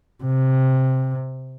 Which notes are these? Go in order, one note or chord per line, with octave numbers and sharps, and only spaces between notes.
C3